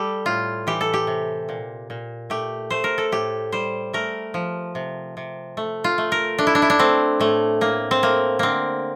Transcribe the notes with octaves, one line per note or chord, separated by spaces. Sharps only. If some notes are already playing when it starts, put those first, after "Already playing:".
Already playing: G3 G4 A4
A2 F4
E3 G4
A4
G4
C3
A#2
A#2
A3 G4
A3 C5
A#4
A4
A2 G4
G3 C5
A3 A#4
F3
C3
C3
A3
F4
A3
A#4
A3 D4
E4
D4
E4
D4
A3 C4
A2 A3
A2 A#3
C4
A3 A#3
D3 A#3 C4